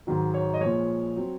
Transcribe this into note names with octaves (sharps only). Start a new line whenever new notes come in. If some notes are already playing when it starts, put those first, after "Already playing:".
G#2 D#3 F#3
C#5
D#5
A#2 F3 G#3 C#5
F#3 C4